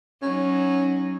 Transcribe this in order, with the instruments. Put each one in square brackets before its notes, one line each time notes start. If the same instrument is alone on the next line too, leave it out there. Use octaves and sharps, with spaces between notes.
[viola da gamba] F#3 D#4 [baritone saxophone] C#4